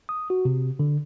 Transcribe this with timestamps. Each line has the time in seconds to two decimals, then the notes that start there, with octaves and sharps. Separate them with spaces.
0.09 D#6
0.30 F#4
0.45 C3
0.79 D3